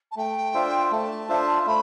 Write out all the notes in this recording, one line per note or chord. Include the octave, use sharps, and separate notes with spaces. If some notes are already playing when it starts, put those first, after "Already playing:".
A5
A3 G5
D4 F4 C5 E5
A3 A5
D4 F4 C5 E5
A3 B5